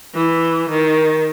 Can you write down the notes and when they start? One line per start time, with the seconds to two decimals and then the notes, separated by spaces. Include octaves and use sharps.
0.15 E3
0.70 D#3